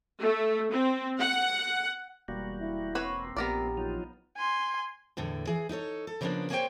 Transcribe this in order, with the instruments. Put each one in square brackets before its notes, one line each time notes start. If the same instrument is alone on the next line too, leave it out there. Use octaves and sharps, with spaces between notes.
[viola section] A3
C4
F#5
[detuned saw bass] E1 [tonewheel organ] G3 A#3 F#4
[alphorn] E4
[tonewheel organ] A#3 C4 [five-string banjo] F#4 B4 C#5
[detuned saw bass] A#1 [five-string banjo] B3 A#4 D5 [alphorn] G4
[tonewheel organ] F#3 D#4 F4
[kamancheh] G#5 C6
[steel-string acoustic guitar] E2 A2 D3
E3 G#4
D#4 E4 A4 C#5
A4
C#3 F3 G3 A#3 B3 D4
A#3 G#4 C5 C#5 D#5 G5